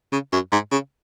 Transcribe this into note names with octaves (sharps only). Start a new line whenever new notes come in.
C#3
F#2
G#2
C#3